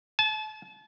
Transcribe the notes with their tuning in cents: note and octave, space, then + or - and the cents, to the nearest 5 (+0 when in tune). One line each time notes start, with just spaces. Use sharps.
A5 -35